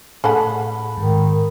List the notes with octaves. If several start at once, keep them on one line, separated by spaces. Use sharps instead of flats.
A2 G#4 A4 F#5 B5
G#2 D#3